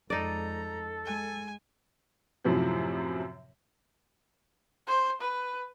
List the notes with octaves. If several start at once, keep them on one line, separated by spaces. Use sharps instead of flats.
F2 G#3 D#4 A4 D5 A#5
G#3 G#5
F#2 A2 C3 F3 F#3
C5
B4